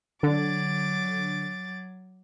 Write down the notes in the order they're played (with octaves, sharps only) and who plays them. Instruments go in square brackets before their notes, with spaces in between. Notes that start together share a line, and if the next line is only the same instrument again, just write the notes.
[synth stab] D3 [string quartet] F#3 D6 A6